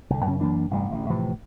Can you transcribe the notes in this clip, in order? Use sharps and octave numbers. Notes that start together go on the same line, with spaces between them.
C2 D3
F#2 C#3 C#4
F#2 E3 A#3 D4
A1 G2 C3 G3
A1 D2
A2 C3 E3 F3